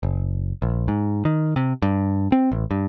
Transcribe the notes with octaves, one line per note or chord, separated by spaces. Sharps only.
F#1
A#1
G#2
D#3
C3
G2
C4
A1
G2